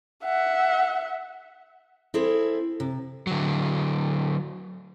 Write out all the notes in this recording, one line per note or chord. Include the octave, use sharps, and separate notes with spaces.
E5 F#5
C4 E4 G#4 A4
C3
D3 F#3